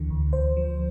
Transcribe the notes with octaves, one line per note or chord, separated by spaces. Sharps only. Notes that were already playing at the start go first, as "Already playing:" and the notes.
Already playing: D2 D3 E3
D2
D2 C5
F3